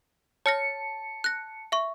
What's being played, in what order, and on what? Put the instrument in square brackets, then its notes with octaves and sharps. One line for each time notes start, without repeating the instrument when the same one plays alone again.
[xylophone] C#5 F6 A#6 [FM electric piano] A5 C#7
[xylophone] F#6 A#6
E5 C#6